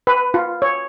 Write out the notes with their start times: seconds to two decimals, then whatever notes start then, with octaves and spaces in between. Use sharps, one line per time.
0.07 B4
0.34 F4
0.62 C#5